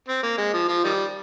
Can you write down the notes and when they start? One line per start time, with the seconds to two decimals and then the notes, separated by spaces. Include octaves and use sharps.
0.08 C4
0.23 A#3
0.38 G#3
0.54 F3
0.68 F3
0.84 D#3 G3